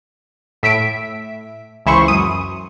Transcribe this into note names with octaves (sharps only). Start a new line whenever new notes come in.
A2 E5 B6 D7
C#2 E3 E4 C5 C#6
F#2 D#6